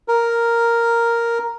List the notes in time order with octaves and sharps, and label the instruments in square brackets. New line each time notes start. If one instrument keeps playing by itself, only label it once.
[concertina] A#4